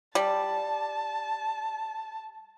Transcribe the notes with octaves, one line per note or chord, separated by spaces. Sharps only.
G3 A5